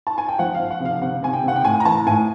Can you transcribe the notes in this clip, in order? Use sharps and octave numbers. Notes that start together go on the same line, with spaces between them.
A5
G#5
G5
F3 F#5
F5
F3
F#5
C3
F5
C3 F#5
C3 G#5
G5
C3 F#5
G5
A2 G#5
A#5
E3 A5
A2 G#5